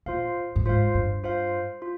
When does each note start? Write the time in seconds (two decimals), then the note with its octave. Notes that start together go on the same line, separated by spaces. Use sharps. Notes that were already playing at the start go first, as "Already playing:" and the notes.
0.06 A#2 F4 C5 F5
0.56 G2
0.66 G#2 F4 C5 F5
0.95 G2
1.24 F4 C5 F5
1.82 F4